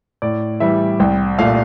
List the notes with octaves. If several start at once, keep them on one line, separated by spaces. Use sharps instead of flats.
A2 D5
E3 G3 E5
C2 G5
A#2 A3 F5